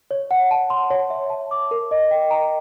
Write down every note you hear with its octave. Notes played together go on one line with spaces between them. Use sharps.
C#5
F#5
A5
C6
C#5
E5
A5
D6
A#4
D#5
G5
A#5